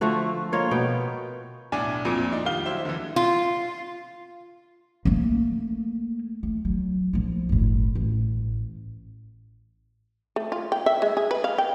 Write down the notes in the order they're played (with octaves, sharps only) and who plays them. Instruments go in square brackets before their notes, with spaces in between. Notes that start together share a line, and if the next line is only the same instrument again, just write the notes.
[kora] D3 F3 A3 F#4
A#3 F4 C#5 D#5
B2 B3 G5
[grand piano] B1 A2 D4 G#5 D6
F2 A#2 F3 D7
D4 D#4
D#3 G3 F4 F5 G7
F#3 E4 C5 E5
D3 E3
[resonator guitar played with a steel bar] F4
[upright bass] A3 A#3
A3
F#3
A#1 F3
G1 A2
A1
[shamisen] A3
F4
G5
E5
G#3
G#4
B4
F5
G5